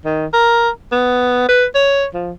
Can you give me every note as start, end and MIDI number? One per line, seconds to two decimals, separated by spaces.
0.05 0.26 51
0.33 0.70 70
0.92 1.46 59
1.48 1.65 71
1.75 2.06 73
2.14 2.32 53